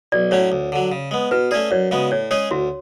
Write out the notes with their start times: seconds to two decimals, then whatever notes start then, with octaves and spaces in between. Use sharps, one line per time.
0.12 B1 D5
0.31 A2 F#3 C#4 C#5
0.52 D2
0.72 D3 F#3
0.92 C#3
1.11 G#3 B3
1.31 B2 B4
1.51 A3 C#4 G#4 D5
1.71 F#2 C#5
1.91 C#3 G#3 B3 F#4
2.11 A2 C#5
2.31 G#3 C#4 G#4 C#5
2.51 D2 F#4